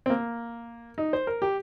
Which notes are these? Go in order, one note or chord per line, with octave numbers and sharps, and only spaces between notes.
C4
A#3
D#4
C5
A#4
G4